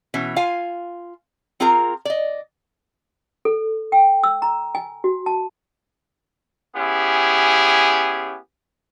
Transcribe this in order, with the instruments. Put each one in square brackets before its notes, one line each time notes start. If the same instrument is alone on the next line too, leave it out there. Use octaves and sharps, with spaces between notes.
[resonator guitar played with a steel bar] B2 E3 C#4
F4 F5 G#5
C4 F4 G#4 A#4 A#5
D5 D#5
[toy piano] A4
G5
E6
A#5
G#5
F#4
A5
[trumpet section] B3 C#4 E4 G4 G#4